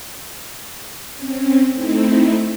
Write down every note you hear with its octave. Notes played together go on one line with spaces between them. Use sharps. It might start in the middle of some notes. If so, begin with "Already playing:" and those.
C4 C#4
A3 C4 D#4 E4